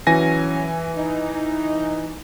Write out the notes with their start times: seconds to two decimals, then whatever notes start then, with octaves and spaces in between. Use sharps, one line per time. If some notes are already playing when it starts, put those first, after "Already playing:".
0.07 E3 F#3 C#4 G#5 A#6
0.97 D#4